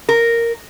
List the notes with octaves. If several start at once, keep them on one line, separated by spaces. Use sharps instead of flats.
A#4